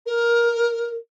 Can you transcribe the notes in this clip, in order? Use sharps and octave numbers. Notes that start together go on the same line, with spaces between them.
A#4